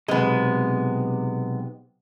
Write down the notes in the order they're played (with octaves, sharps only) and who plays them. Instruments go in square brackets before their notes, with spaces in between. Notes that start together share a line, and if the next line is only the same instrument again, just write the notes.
[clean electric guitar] B1 C3 [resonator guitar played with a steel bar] G#3 B3